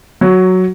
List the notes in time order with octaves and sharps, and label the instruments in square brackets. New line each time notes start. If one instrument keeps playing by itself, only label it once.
[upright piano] F#3